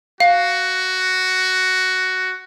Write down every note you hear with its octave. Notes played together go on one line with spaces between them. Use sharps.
F#4 F5